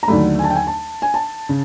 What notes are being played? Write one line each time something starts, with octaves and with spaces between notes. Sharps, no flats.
A#5
D#2 D3 F#3 A3 B5
G#5
A5
G5
G#5
A5
G#5
A5
C#3